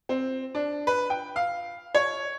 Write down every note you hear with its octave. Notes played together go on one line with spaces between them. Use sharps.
C4
D4
B4
G5
F5
C#5